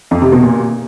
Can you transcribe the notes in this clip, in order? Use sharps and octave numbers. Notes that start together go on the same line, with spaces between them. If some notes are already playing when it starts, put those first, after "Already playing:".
F2
C3
B2
A#2